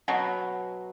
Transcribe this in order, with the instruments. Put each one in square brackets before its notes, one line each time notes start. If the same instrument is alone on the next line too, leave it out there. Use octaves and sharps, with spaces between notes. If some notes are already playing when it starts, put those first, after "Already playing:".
[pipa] B2 F#3